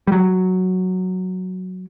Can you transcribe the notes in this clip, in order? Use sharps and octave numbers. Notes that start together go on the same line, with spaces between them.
G3
F#3